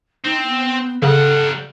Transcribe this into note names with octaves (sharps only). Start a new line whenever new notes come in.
C4 D#4
B3
C#3 G3 A4 F#5